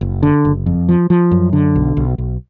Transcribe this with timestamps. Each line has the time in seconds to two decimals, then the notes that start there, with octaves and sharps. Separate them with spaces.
0.01 F#1
0.23 D3
0.45 F#1
0.66 F2
0.89 F3
1.10 F3
1.31 F#2
1.53 D3
1.76 B1
1.97 B1
2.18 B1